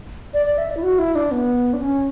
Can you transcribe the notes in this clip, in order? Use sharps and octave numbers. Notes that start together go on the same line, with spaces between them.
D5
D5
E5
D5
E4
F#4
E4
D4
B3
D4
C#4